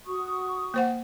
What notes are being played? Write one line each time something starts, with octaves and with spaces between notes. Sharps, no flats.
F#4 C#6 D#6
A#3 C5 F#5